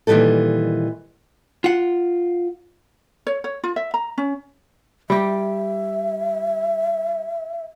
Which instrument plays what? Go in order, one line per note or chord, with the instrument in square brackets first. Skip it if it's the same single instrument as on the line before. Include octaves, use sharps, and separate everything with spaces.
[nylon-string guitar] A#2 D#3 E3 G3 D#4 A4
[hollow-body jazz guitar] F4 F#5
[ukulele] C#5
C#5
F4
E5
A#5
C#4
[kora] G3 G4 [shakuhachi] E5